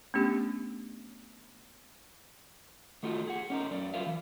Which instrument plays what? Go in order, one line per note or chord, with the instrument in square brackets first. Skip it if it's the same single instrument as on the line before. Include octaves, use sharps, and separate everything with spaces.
[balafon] A3 B3 C#4 D4 G4
[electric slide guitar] D#3 A3 D#4 F4 F#4
G#4 F#5
C#4 D#4 A#4
F#2 D5
F4 F#4 A#4 B4 E5 F5
E3